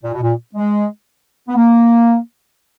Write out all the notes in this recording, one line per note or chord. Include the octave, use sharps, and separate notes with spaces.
A#2
B2
A#2
G#3
B3
A#3